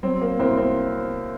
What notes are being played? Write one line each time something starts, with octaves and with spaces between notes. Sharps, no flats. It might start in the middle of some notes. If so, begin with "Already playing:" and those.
F#3 C4
A#3
C2 C4
C4